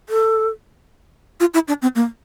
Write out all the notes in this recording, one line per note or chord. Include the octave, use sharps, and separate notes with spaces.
A4
F4
E4
D4
C4
A#3